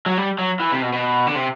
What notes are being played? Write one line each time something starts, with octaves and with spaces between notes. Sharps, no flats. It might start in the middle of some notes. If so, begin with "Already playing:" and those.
F#3
G3
F#3
E3
C3
B2
B2
D3
C3